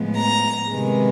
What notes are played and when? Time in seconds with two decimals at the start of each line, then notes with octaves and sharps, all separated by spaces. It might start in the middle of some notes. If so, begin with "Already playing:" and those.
Already playing: A2 F3 G#3 B3
0.16 A#5
0.71 C3 D#3 G#3 B3